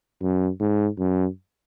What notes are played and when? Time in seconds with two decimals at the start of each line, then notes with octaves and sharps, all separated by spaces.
0.22 F#2
0.60 G#2
0.99 F#2